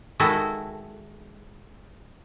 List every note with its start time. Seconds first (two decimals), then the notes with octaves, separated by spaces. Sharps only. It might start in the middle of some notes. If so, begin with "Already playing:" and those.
0.20 D#3 G#3 E4 F#4 A4